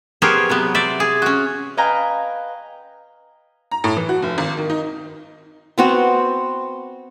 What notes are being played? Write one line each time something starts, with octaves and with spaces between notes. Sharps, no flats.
B3 G4 G#4 A#4 C5 C#5
C3 F#3 B3
C5 D5 E5
G#4
C#4 F#4
B4 D#5 F5 G5 G#5 A#5
A#5
A2
E3
F#4
F1
G#1
D#3
D#4
B3 C4 F#4